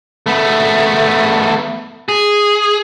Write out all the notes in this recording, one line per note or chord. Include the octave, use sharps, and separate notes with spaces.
A3 B3
G#4